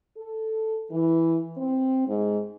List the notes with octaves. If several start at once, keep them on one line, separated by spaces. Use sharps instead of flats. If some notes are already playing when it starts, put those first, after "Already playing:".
A4
E3
C4
G#2